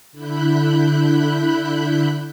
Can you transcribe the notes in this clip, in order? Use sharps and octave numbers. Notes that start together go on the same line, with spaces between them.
D3 E4 B5 F#6 G6